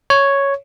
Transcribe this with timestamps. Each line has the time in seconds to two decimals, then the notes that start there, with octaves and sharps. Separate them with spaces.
0.10 C#5